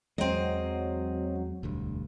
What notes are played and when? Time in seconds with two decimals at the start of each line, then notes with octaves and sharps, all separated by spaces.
0.18 E2 F#3 G#3 C4 D#5
1.63 E1 D2 G2